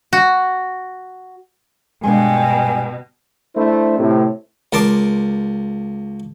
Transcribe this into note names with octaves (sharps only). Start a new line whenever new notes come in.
F#4
G2 B2 G#3 A#3 D4 G5 G#5
A3 D4 E4 C5
A2 C3
C#2 A#4 A5 C6 D6